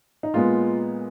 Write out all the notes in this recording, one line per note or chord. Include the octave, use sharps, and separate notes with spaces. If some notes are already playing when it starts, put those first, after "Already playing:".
D#4
A#2 G#3 B3 F4